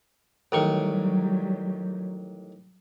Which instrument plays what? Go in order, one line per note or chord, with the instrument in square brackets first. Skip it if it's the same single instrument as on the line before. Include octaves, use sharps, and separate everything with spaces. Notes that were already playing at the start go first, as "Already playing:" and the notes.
[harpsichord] A1 D#3 C#6 [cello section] F#3 G3